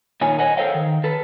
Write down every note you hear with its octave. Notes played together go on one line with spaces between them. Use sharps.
A#2 D#3 C#5 G#5
C#5 D#5 F#5 G#5
A4 A#4 C5 C#5 F5 G5
D#3
A4 B4